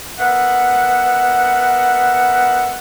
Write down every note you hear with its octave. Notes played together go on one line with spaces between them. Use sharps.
B3 A#4 E5 F#5